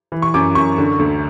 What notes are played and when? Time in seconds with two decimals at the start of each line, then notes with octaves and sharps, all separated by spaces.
0.12 E3
0.22 C#6
0.34 F#2 D6
0.55 F#2 C#6
0.78 D3
0.99 D2